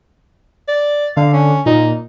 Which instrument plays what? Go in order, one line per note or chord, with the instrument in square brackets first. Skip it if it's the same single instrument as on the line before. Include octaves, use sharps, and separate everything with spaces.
[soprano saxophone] D5
[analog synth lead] D3 [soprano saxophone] F5
[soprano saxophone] C#4
[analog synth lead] A#2 [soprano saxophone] D#4